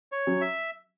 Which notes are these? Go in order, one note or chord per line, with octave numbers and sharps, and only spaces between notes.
C#5
F#3 C#4
E5